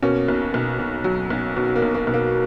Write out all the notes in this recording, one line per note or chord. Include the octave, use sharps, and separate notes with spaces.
B2 A#3 C#4
B1
B1
B2
F#3
B1
B2
A#3
B1
A#3
B1
A#3